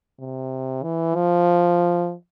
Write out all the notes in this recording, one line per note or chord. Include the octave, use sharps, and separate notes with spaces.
C3
E3
F3